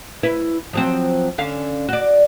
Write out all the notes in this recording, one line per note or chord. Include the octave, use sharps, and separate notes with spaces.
E4 B4
F3 F#3 C4
D3 C#4 F5
F#4 D5